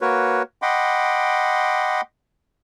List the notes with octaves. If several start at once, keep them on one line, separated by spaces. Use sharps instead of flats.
A#3 F#4 A#4 B4 C#5
D#5 F#5 G5 B5 C6 D6